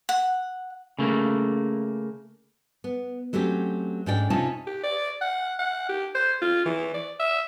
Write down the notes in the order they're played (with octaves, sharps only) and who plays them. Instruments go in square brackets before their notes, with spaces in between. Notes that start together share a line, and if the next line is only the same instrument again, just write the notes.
[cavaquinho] F#5
[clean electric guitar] C#3 A3 A#3
[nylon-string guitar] B3
F#3 A3 C4 C#4 G4
G#2 C#4 D4 D5 G5
C3 C#4 D#4 F4 C#5 A5
[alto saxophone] G4
D5
F#5
F#5
G4
C5
F4
E3
D5
E5